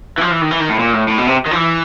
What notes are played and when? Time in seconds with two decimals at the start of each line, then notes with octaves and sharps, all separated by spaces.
0.18 E3
0.21 F3
0.31 E3
0.42 D#3
0.51 E3
0.60 D#3
0.69 A2
0.79 A#2
0.93 A2
1.08 A2
1.18 B2
1.27 C3
1.46 D#3
1.51 F3
1.55 E3